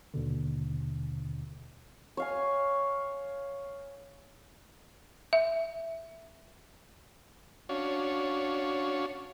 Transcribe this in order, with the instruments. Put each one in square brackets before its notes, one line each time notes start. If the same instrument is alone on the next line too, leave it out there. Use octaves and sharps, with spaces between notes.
[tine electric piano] D#2 B2 D3
[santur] C#5 F5 G#5
[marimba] E5
[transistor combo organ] C#4 D4 F#4 C#5 F5